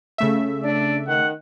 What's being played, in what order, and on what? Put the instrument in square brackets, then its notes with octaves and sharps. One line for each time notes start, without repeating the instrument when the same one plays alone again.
[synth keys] C#3 A3 E5
[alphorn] D4 [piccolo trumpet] D5
[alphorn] D#3 [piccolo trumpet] F#5